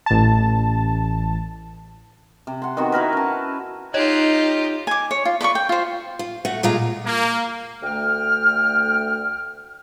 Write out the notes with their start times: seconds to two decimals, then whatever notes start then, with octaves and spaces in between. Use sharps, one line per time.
0.06 A1 A5
2.47 C3
2.62 F#5 C6
2.77 D#3 B3 C4 F#4
2.92 E4 F#4 A#4 B4
3.13 C#4 A5
3.94 D#4 F4 G4 C#5 D#5
4.87 G#5 D6
5.11 C#5
5.25 F4
5.41 B4 D5 F#5 C#6
5.55 G5
5.69 F4 C5
6.19 F4
6.45 A3 F#4
6.63 A#2 G#3 F4 A#5
7.05 A#3
7.83 D2 D3 A3 G5 F6